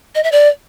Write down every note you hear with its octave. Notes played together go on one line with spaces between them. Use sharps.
D#5
E5
D5